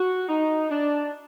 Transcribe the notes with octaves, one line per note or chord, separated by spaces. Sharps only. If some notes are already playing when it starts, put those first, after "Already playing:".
Already playing: F#4
D#4
D4